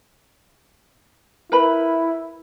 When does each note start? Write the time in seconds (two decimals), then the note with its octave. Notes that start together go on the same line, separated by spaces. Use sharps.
1.52 E4 A#4 B4 B5